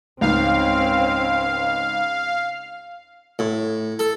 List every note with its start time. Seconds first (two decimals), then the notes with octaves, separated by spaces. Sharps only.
0.21 C#2 G#2 C4 C#4 F5
3.39 A2
3.99 A4